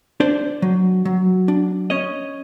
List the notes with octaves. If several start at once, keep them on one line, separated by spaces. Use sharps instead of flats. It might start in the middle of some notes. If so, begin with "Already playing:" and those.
D4 C5 D5
F#3
F#3
D4
C#4 C#5 D#5